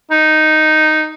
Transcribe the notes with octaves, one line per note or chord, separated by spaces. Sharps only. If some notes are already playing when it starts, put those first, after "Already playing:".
D#4